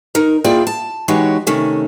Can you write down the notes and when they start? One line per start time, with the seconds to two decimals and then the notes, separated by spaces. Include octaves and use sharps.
0.15 D#4 A#4
0.44 A#3 E4 F4 G#4 D5 G5
0.67 A5
1.08 E3 G#3 D#4 F#4 G4 C#5
1.47 C3 D#3 A3 C#4